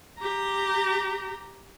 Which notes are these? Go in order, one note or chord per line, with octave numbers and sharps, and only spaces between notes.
G4 A#5